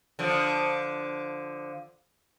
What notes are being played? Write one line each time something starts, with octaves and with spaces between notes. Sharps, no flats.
D3 F3